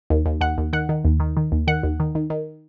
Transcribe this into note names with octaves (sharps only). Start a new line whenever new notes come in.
D#2
D#2
D#2 F#5
D#2
D#3 F#5
D#3
D#2
D#3
D#3
D#2
D#3 F#5
D#2
D#3
D#3
D#3